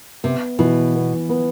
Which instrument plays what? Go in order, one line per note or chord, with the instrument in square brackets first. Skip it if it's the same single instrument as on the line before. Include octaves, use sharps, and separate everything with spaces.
[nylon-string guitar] C3 [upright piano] B3
[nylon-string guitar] B2 [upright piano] E3
[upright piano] B3
B3